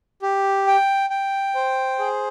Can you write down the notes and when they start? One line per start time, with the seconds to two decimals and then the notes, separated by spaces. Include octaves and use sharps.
0.22 G4
0.67 G5
1.10 G5
1.55 C5
1.99 G#4